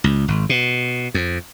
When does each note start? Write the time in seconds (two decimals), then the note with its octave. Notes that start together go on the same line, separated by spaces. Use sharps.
0.04 C#2
0.28 G#1
0.49 B2
1.14 F2